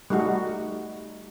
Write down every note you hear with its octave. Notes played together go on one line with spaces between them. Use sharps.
G3 A3 D#4 F#4